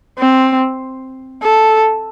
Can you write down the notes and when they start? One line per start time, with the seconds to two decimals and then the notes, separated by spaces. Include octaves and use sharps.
0.19 C4
1.43 A4